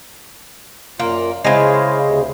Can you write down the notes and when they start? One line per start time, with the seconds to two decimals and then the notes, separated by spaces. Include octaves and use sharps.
1.00 F#2 A#2 A#3 F4
1.45 C#3 G#3 E4 C5 F5
2.06 D2 C3